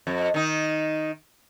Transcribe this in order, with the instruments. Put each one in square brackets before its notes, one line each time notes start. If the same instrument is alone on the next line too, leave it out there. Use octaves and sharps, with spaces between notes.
[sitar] F2
D#3 D#4